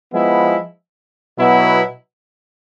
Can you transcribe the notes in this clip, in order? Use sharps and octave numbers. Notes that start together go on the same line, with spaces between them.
F3 G#3 B3 E4
B2 F#3 B3 E4